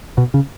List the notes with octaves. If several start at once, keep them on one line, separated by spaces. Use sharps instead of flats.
B2
C#3